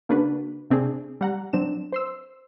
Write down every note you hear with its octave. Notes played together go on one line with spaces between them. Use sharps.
C#3 A#3 D4 F#4 B4
C3 C4 D4 G#4
G3 F#5 A#5
F#3 C4 D4 E7
C5 C6 E6